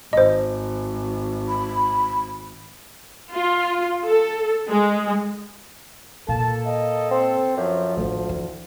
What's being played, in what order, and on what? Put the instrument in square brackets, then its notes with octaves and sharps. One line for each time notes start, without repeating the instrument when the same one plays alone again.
[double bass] G#1 [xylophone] C5 D#5
[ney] B5
[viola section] F4
A4
G#3
[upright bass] A#2 [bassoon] A#3 [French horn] A4 [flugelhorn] A5
[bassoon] A#3 [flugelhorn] D#5
[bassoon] C4 [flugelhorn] C5
[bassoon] F#2 [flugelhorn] F3
[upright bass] A1 A3 [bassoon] D2
[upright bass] E3